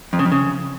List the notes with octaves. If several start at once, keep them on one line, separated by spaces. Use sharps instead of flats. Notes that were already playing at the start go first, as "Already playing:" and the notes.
F2
C#3
F2
C#3